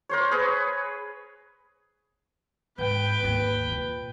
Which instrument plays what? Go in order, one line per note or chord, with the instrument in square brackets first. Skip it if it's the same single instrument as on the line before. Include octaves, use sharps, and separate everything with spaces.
[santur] A#4 C5 C#5
G#4 B4 C#5
[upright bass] G#2 [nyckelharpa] B4 G5
[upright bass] G#1 D#2
A#2